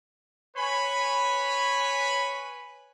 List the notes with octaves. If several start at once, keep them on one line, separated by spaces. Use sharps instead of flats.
B4 C#5 G#5 B5